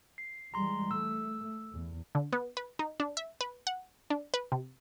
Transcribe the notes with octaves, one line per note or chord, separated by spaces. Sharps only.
C7
E3 G3 G#3 A#5 C6
A3 E6
E2
D3
B3
B4
D#4
D4
E5
B4
F#5
D4
B4
C3